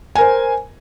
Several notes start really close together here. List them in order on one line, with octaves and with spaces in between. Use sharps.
G#5 A#4 C5